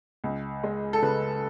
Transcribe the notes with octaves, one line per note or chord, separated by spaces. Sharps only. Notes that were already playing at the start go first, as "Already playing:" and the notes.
C#2
G#3
A4
C#3 B4